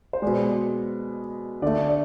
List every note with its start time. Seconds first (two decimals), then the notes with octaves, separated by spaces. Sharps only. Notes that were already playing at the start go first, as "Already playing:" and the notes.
0.13 C5
0.22 B2 G#3 D5
1.62 D3 A3 D5
1.89 D5